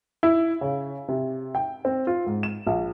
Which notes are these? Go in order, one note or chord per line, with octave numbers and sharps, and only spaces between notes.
E4
C#3
C3
G5
C4
F4
G#2
E7
A#1